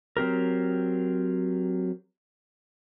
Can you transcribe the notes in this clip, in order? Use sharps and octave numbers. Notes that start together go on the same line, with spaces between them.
F#3 C4 G4 A#4